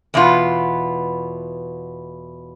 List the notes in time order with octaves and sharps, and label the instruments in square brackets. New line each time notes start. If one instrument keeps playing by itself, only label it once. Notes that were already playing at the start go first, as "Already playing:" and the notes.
[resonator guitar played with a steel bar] E2 B2 B3 F4